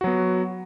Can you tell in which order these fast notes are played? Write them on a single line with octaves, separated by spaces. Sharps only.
F#4 F#3 B3